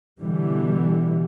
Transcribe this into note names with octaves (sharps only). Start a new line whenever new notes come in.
B2 D3 E3 G3